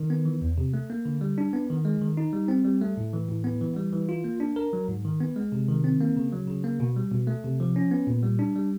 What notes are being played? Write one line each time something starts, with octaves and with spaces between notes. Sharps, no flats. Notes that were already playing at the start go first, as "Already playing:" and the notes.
Already playing: D#3
B3
E3
E2
C3
A3
A#3
D3
G3
D4
B3
D#3
G#3
D#3
D#4
G3
C4
G3
A3
A2
E3
A2
B3
E3
G3
E3
F4
A#3
D4
A#4
F#3
G#2
D#3
B3
G#3
C3
D#3
C4
A#3
C#3
F#3
C#3
A#3
B2
G3
B2
A3
C3
F3
C#4
B3
A#2
G3
D4
G3